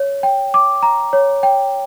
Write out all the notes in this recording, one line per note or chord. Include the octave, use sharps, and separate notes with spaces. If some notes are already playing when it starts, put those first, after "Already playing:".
Already playing: C#5
G5
D6
A#5
C#5
G5